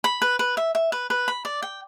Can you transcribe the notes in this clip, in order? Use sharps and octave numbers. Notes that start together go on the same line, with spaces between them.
B5
B4
B4
E5
E5
B4
B4
B5
D5
G5